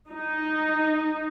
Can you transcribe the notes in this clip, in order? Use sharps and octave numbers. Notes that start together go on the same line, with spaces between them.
D#4